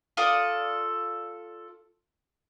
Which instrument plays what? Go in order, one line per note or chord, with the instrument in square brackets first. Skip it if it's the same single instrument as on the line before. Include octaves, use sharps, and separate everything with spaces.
[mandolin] F4 A4 D5 D#6